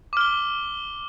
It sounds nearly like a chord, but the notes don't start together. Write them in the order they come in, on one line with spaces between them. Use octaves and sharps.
D6 F6 G7